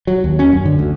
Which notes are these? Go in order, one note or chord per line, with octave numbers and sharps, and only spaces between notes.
F#3
D#2
C#4
F#2
D3
D2